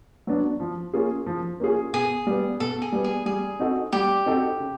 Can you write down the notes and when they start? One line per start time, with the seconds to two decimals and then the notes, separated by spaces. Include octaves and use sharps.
0.27 F#3 B3 D4
0.60 F3
0.93 A#3 C#4 F4 G#4
1.26 F3
1.60 A#3 C#4 F4 G#4
1.93 B2 G#4
2.27 G3 B3
2.60 B2 A4
2.82 G#4
2.92 G3 B3
3.04 G#4
3.26 G3 G#4
3.59 C4 D#4 F#4 A4
3.92 G3 G4
4.26 C4 D#4 F#4 A4
4.59 C#3